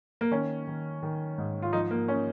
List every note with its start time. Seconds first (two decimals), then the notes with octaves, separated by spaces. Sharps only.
0.21 A#3
0.31 D#3 C#4
0.67 D#3
1.03 D#3
1.38 G#2
1.62 F4
1.73 F3 D#4
1.91 A#3
2.08 C#4